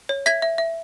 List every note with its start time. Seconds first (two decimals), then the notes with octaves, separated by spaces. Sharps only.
0.09 C#5
0.26 E5 G#6 B6
0.42 E5
0.58 E5